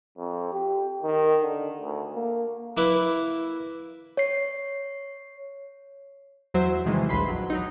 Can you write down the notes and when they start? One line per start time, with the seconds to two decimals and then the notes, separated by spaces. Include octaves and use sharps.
0.18 F2
0.53 G4
1.03 D#3
1.42 D3
1.81 D2
2.15 A#3
2.77 A#3 E4 B4
4.17 C#5 C7
6.54 E2 F#3 C5 E5
6.85 C3 D#3 E3 G3 G#3
7.09 A#1 D#2 B4 B5 C6 C7
7.28 F2 F#3
7.50 F#3 D#4